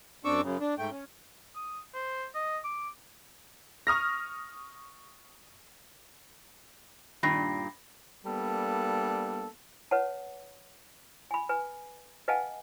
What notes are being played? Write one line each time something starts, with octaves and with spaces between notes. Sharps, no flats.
F#2 C4 D4 C#6 D6 E6
F#2 C#3
D4
G#2 A3 G5
C#4
D#6
C5
D#5
D6
C#6 D#6 F6 A#6
G2 A#2 D#3 B5 A#6 C7
G3 A#3 B3 D4 A4
B4 C#5 F#5 A5
G#5 B5
B4 G#5
B4 D#5 F5 F#5 G#5 A5